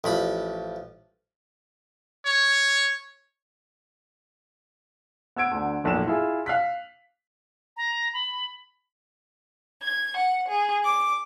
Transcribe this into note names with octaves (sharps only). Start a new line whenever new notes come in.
A1 F3 B5
C#5
B3 E6 G#6 D7
D2 D3
F1 B1 A#2 E7
E4 F4 G#4
F5 F#6 B6
A#5
B5
G#6
F#5
G#4
D6